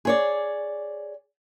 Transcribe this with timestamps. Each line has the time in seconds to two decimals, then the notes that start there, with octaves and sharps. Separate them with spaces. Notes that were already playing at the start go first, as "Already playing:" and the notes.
0.05 G#4 C#5 D5